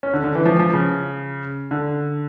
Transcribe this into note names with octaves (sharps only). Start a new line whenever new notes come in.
C#4
D3
D3
E3
F3
F3
C#3
D3